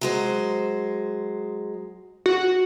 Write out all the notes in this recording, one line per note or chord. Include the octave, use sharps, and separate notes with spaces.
F#3 G#3 C5
F#4